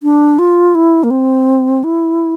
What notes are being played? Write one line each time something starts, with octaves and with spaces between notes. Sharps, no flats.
D4
F4
E4
A#3
C4
E4